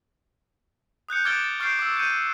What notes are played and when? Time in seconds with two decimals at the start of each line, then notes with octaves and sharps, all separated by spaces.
1.09 D#6 F#6 G6 C#7
1.25 D6 F6 G#6 A6 D7 G7
1.44 A6
1.60 C#6 F6 G6 A6 C7 D7
1.79 D6 E6
1.97 G6 C#7 D#7